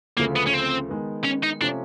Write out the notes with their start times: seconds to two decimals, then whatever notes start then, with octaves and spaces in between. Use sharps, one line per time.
0.17 D2 C#3 F3 A3 A#3
0.36 B3
0.47 C#4
0.54 C4
0.89 D#3 G#3 B3
1.25 C#4
1.43 D#4
1.61 C3 F3 A3 C#4 D4